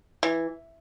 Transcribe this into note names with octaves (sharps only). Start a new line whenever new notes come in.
E3